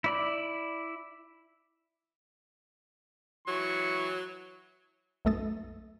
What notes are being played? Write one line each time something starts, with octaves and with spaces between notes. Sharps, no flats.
E4 D5 B5
E3 F#3 C#6
B1 F#2 A3 A4 D#6 A6